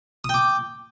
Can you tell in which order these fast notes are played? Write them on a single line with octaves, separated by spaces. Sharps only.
D#6 G5 D6